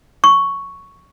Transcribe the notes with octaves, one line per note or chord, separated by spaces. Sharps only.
C#6